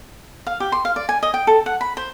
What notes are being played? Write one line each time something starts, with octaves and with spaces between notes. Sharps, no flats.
F5
G4
C6
F5
D5
G#5
D#5
G5
A4
F#5
B5
C5